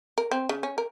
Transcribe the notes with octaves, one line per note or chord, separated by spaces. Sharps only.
A#4
C4
C#3
C#4
A#4